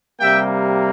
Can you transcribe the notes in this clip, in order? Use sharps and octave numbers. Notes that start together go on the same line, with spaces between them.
C3 G3 A#3 E5 G5